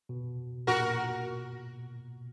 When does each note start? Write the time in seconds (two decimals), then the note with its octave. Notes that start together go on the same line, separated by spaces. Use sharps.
0.09 B2
0.67 A#2 F#4 A#4